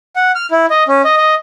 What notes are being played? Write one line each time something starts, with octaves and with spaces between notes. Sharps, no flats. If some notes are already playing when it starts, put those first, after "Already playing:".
F#5
F6
E4
D#5
C#4
D#5
D#5